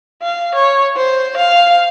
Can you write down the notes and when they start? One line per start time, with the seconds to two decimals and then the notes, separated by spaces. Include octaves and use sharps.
0.23 F5
0.54 C#5
0.96 C5
1.37 F5